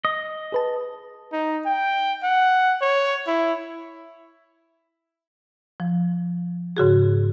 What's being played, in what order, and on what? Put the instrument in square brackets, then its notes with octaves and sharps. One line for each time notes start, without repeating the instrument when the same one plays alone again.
[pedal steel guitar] D#5
[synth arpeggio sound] G#4 B4 A5
[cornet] D#4
G5
F#5
C#5
E4
[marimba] F3
G#2 C#3 F#4 G#4